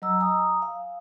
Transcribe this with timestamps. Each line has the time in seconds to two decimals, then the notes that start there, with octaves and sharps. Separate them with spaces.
0.02 F#3 D#5 A#5 E6
0.20 G#5 A#5 D#6
0.62 F5